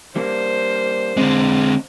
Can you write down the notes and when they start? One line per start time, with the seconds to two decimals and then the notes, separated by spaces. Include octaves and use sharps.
0.16 G3 A#3 D4 C5
1.17 D3 G#3 C4 D#5